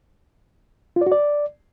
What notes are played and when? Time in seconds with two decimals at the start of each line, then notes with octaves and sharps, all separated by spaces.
0.96 F4
1.01 D5
1.06 F#4
1.12 D5